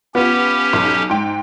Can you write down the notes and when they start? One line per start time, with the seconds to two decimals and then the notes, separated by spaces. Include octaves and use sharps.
0.15 B3 C#4 F4 G4
0.73 B1
1.10 G#2 G5